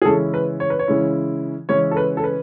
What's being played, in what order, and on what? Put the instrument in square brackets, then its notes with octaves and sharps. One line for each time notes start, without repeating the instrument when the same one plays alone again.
[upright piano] G#4
C#3 E3 G#3 C#4 E4 A4
B4
C#5
B4
C#5
C#3 E3 G#3 C#4 E4
C#3 E3 G#3 C#4 E4 C#5
A4
B4
A4
B4